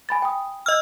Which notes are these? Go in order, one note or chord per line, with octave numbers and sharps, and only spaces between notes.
G#5 B5 A6
G5 D#6
D#5 E6 F6